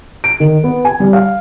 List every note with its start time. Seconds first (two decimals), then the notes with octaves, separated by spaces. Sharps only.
0.24 D7
0.40 D#3
0.63 B3
0.85 G#5
1.00 G3
1.13 F5